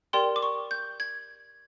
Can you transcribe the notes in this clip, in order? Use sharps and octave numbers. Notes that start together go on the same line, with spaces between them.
G4 A#4 D5 G5 C6
D6
C#6
G6
G#6